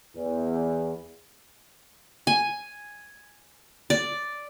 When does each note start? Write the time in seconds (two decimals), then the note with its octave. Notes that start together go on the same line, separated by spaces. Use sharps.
0.15 E2
2.27 G#5
3.90 D5